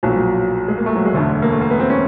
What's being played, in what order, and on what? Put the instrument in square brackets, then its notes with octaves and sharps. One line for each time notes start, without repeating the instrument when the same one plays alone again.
[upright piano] B1 A#2 F3 F#3
F#3
G#3
A#3
A3
F#3
G#3
E1 D2 D3 A3
A#3
A3
A#3
B3
C4
C#4